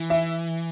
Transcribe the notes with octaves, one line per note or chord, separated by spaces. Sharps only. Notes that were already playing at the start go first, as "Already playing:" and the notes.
Already playing: E3
E5